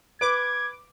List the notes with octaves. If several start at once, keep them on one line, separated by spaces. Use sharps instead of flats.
B4 D6 G#6